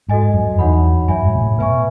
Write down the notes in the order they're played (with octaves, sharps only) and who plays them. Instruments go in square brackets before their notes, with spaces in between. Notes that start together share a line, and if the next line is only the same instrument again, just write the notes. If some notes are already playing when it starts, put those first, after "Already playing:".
[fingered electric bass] G#2 [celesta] F#4 A4 D#5 G#5
[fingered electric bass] F#2
F#2
[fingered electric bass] E2 [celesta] D#4 F#4 C#5 F#5 B5
[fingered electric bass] F#2 [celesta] C#5 E5 G#5 B5
[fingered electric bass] G#2
B2
A2
[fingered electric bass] B2 [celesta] B4 E5 G#5 C#6